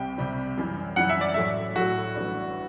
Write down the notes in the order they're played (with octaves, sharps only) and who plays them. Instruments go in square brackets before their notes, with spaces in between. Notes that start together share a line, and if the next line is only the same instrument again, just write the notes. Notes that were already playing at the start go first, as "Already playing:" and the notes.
Already playing: [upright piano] C2 C3 G3 [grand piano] G5
[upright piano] C2 C3 G3
F#2 E3 G3
[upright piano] F#2 E3 G3 [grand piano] F#5
[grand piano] E5
D5
[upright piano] A2 F#3 A3 [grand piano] E5
[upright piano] A2 F#3 A3 [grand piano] F#4
[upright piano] A1 A2 G3 D4